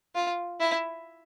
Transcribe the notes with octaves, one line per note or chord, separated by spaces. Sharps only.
F4
E4